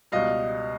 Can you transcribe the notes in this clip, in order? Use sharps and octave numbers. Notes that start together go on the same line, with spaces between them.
C#2 B2 G3 D#5 F5